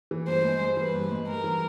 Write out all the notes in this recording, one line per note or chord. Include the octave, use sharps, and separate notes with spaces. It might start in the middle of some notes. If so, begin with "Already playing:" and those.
E3
G2 C5
G#3
G2
E3 B4
G2
G#3
G2 A#4
E3